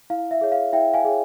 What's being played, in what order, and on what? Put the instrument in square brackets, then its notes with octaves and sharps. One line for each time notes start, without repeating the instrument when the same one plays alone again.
[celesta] E4 F5
E5
G#4 C#5
F5
E4 E5 G5
F5 G#5
G#4 C#5